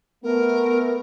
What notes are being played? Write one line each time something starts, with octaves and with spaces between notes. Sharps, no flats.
A3 B3 A#4